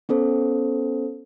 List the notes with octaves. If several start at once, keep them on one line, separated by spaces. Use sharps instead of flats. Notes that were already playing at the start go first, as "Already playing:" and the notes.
B3 C#4 A4 C5